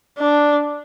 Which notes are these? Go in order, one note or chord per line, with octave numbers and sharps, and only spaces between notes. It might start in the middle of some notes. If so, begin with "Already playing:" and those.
D4